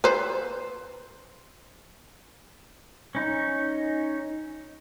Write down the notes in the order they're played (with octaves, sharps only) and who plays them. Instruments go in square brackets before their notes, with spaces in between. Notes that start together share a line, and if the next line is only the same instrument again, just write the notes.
[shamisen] B4 C5
[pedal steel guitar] C#4 D#4